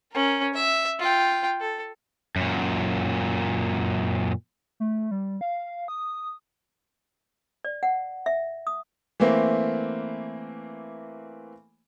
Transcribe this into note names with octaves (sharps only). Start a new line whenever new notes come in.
C#4 A#4
E5
F4 G5
A4
F#2 A#2
A3
G3
F5
D#6
D5
F#5
E5
D#6
E3 A3 A#3 C4